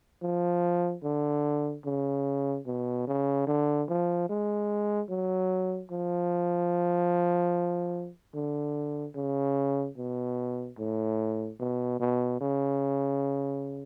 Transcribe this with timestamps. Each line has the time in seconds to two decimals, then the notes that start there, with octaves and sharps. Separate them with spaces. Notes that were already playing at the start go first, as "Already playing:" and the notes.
0.22 F3
1.04 D3
1.85 C#3
2.66 B2
3.08 C#3
3.47 D3
3.89 F3
4.29 G#3
5.10 F#3
5.91 F3
8.34 D3
9.16 C#3
9.97 B2
10.78 A2
11.60 B2
12.00 B2
12.41 C#3